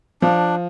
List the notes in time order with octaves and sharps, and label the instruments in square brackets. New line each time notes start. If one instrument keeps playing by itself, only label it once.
[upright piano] F3 [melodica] D4